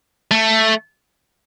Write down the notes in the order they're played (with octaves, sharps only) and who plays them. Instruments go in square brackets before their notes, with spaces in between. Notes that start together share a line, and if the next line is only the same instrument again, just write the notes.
[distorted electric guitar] A3